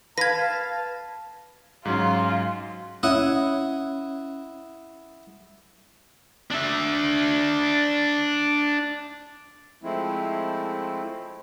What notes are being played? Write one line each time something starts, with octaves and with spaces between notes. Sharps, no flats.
B4 F5 A5 G#6 A#6
G#2 F#3 C#4 F4
C#4 E4 D#5 F#5
D4 E5
F3 G#3 A3 C4 E4